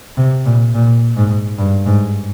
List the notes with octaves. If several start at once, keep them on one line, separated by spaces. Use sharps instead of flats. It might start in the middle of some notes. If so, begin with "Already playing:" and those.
C3
A#2
A#2
G#2
G2
G#2